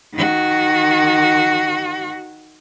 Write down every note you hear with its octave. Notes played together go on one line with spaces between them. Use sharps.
D#3 F#4